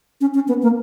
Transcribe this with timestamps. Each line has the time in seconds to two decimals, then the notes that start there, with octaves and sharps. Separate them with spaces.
0.21 C#4
0.34 C#4
0.48 B3
0.63 A#3